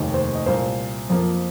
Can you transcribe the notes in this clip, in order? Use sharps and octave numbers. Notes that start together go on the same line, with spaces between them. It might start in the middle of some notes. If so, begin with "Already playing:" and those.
Already playing: F1 D#2 D#3 A#3
C5
D#5
C2 A#2 A#3 C5
F2 F3 A#3